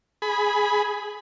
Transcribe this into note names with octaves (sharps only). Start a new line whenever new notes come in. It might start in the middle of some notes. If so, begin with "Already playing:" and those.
G#4 B5